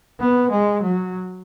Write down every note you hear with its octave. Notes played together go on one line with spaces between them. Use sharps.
B3
G#3
F#3